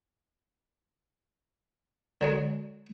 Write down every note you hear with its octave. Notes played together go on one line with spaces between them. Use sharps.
D3 F#3 G#3